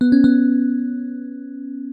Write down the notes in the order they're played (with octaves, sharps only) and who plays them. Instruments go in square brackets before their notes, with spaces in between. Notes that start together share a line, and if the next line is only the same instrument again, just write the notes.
[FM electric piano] B3
C#4
B3